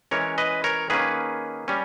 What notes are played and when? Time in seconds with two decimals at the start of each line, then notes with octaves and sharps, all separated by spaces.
0.11 E3 G#3 C#4 A#4 C#5
0.38 B4 D#5
0.64 A#4 C#5
0.90 D#3 A#3 C#4 G#4 B4
1.68 G3 C#4